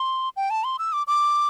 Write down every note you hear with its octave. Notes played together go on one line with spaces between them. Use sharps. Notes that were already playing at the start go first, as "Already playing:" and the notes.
Already playing: C6
G5
A5
C6
E6
D6
D6